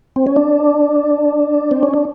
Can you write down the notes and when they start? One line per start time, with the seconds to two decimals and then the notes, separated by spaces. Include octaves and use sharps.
0.16 C4
0.27 C#4
0.36 D4
1.71 C4
1.83 C#4
1.94 D4